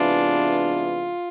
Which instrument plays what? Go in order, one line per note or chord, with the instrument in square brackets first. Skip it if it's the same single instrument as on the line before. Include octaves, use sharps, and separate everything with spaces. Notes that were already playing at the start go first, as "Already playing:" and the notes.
Already playing: [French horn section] C3 E3 G#3 B3 D4 F4